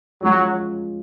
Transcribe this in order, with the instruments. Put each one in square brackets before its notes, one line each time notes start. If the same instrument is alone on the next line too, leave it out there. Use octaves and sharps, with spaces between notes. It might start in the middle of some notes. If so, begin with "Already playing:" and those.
[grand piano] F3 G#3 C#4 F4 [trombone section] F#3